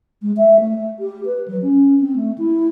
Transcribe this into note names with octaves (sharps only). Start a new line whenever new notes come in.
G#3
E5
A3
G4
B4
F#3
C#4
C4
A3
E4